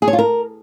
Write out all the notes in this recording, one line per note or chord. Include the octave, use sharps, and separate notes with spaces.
G#4
C#5
F4
A#4